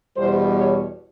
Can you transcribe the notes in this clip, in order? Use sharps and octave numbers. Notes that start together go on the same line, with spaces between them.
E2 B2 G3 C5
C#5